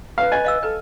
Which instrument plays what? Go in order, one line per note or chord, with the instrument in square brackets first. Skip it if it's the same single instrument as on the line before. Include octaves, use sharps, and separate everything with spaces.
[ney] B4 [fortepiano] F5
[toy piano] D#5 [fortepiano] G#5
[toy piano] D#5 F5 E6
[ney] A4 [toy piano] B4